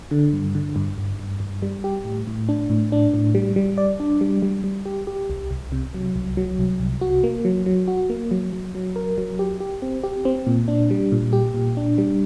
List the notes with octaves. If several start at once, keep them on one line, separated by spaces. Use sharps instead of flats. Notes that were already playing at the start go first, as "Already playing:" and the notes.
D3
G2
D3
G2
G2
G2
G2
G3
G4
A2
A2
D4
A2
D4
A2
G3
G3
D5
D4
G3
G3
G3
G4
G4
C2
C2
C3
F#3
C2
F#3
C2
C2
F#4
A#3
F#3
F#3
F#4
A#3
F#3
F#3
F#3
A#4
F#3
G4
G4
C4
G4
C4
A#2
D4
G3
A#2
G4
A#2
D4
G3